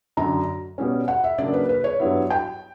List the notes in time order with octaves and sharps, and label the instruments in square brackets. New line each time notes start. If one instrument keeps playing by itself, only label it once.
[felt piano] F#2 D3 F#3 A#5
B2 G3 C#4
F#5
E5
C#3 F#3 A#3 D4 D5
B4
B4
C#5
G2 F#3 B3 E4
G5